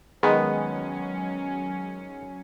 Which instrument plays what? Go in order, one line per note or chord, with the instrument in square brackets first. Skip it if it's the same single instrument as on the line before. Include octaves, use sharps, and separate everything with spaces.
[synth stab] D#3 G#3 [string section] F#3 C#4 [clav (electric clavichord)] B3